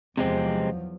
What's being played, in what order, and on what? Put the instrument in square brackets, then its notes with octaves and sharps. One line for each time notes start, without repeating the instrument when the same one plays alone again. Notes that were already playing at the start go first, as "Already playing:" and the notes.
[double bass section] E2 F3 F#3 [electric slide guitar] C3 G#3 C4